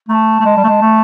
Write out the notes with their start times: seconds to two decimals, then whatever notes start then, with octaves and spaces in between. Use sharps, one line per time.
0.09 A3 A#5
0.13 A5
0.41 A3
0.45 G#3
0.57 G3
0.64 A3
0.69 G#3
0.81 A3